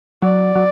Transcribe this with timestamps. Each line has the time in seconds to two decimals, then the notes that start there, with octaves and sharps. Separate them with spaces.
0.22 F#3 D5
0.55 F#3